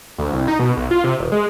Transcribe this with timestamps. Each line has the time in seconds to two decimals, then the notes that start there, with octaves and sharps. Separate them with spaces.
0.18 D2
0.32 C2
0.48 D#4
0.59 B2
0.77 B1
0.91 F4
1.04 C3
1.20 E1
1.32 G#3